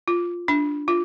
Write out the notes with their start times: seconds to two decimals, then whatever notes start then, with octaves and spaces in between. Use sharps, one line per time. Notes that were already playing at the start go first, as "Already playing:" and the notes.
0.08 F4
0.48 D4
0.88 F4